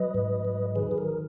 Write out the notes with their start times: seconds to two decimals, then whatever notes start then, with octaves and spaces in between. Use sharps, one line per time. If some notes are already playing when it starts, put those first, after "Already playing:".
Already playing: F#3 B4 D#5
0.14 G#2
0.45 F#3
0.75 D#3 G#4 B4
0.91 G#4
0.98 A#4